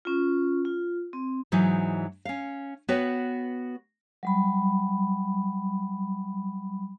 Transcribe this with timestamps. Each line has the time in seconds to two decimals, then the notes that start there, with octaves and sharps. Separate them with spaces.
0.05 C#4 F4
0.65 F4
1.13 C4
1.52 G#2 E3 F#3 D#4
2.25 C#4 F5
2.88 B3 F#4 B4 C#5 G5
4.23 F#3 G3 B5